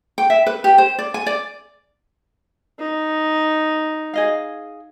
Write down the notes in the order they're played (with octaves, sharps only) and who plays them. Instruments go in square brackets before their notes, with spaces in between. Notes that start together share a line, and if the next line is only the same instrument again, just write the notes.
[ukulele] G5
E5
B4
G4
C5
D5
G#5
D5
[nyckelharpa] D#4
[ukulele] G#4 D#5 F5